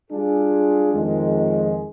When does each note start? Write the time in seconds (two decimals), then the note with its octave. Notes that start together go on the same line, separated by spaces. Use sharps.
0.10 G3 D4 F4 G#4
0.93 F2 D#3 G#3